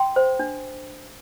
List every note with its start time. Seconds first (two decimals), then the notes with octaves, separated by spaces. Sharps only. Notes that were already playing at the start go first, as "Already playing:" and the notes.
Already playing: G5 C6
0.16 C5
0.39 D4